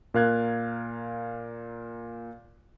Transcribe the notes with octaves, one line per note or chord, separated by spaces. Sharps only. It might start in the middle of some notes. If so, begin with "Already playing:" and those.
A#2 A#4 F5 F#6 G#6